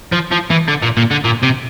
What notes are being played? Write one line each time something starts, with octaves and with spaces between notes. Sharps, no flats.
F3
F3
E3
D3
A#2
A#2
D3
A#2
C3